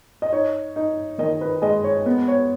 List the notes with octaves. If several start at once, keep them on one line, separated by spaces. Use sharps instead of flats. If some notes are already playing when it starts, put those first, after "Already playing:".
D#5
D#4 C#5
D#4
D#3 D#5
B4
G#3 D#5
C#5
B3 B4
C#5